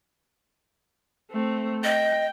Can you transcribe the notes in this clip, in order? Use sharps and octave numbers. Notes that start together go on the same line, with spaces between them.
A3 C4
D#5 G5